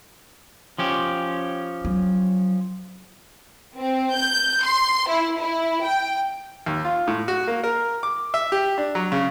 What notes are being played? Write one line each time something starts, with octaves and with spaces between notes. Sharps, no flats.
F3 C#4 G4
F#3
C4
G6
C6
E4
E4
G5
D#2
F4
A2
F#4
A#3
A#4
D6
E5
G4
D4
F#3
C#3